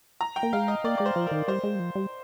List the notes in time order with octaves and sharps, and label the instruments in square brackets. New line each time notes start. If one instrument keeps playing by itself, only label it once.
[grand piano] A#5
G5
[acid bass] A#3
[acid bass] G#3 [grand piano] F5
[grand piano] D#5
[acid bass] A#3 [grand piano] D5
[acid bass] G#3 [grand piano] D5
[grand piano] C5
[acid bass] F3
[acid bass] D#3 [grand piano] A#4
[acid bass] G3 [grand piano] C5
[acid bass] G#3
G3
F3
G3